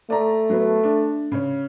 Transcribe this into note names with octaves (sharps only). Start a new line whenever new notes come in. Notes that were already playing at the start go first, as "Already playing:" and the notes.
A3 D5 A#5
F#3 B3
D4
C#3 C#5